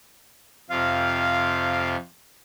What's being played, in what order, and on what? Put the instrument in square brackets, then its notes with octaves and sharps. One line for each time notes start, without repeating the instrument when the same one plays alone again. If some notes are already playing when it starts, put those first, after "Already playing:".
[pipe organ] F2 C3 F4 [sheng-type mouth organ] F5